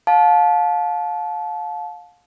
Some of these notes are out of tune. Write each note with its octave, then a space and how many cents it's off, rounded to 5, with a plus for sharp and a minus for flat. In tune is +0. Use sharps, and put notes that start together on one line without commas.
F5 +30 A5 -25